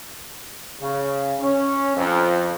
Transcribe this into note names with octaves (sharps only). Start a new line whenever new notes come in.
C#3
C#4
F2